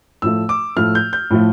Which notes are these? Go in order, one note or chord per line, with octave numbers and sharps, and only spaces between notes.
A2 F3 A3 E6
D6
A2 F3 A3 F6
G6
G6
A2 F3 A3